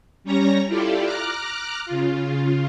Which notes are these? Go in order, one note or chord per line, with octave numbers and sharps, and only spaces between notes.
G3 C#4 C#5 A#5 A#6
E4 F4 G4 A4 D5
A#5 D6 F6 F#6
C#3 F4